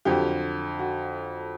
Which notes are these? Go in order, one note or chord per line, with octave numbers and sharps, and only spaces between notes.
F2 D3 F#3 G4
F#4